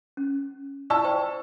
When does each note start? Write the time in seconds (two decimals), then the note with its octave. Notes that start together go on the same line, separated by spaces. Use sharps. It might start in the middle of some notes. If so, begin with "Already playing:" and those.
0.17 C#4
0.90 D5 F5 A5 C#6 E6
1.04 C5 G5 C#6